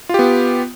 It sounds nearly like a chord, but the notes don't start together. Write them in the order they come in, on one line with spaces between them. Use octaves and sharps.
F4 G4 B3